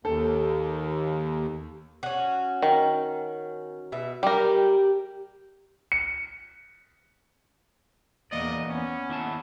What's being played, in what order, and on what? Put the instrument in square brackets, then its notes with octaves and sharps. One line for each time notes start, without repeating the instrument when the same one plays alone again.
[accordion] D#2 [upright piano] A4
[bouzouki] C#4 F#4
[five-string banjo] D#3
[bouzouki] B2 E5
[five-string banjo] G3 A#4 [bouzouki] G4
[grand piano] C#7
[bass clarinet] E2 [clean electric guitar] E3 A#3 D5 [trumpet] D#5
[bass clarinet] B3 [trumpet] C#4
[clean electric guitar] D#2 E4 A5